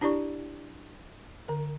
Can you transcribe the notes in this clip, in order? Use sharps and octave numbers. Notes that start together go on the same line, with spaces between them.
D4 E4 G4 D5 C#6
D3 A#4